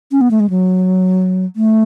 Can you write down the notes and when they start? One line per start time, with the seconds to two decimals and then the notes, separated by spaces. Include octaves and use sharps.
0.12 C#4
0.21 B3
0.31 A3
0.40 G#3
0.50 F#3
1.56 A3